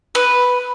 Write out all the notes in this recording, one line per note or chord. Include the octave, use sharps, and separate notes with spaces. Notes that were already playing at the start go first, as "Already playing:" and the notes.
B4